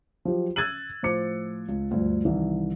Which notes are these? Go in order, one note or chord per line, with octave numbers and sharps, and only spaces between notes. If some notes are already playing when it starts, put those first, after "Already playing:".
F3 F#3 G4
E6 F#6 G#6 A6 D#7 F#7
A2 F3 C5 D6 C#7
C#2
D2 G2 F3
C2 D#3 E3